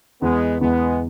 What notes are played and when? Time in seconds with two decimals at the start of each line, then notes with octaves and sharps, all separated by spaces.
0.21 E2 G#3 B3
0.61 E2 G#3 B3